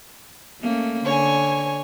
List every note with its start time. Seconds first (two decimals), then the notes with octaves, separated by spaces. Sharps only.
0.61 A3 A#3 C#4
1.05 D3 C#5 G#5